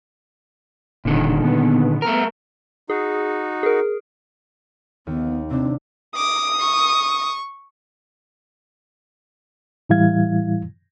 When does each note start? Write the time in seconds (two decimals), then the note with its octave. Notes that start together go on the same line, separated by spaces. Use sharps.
1.05 E1 A#2 D3 D#3
1.44 B3
2.02 A3 A#4
2.90 D#4 F#4 G#4
3.63 G#4 A#4
5.07 D#2 B3
5.51 C3 C4 D4
6.16 D6 D#6
6.59 C#6
9.90 A2 E3 G3 E4 F5 G#6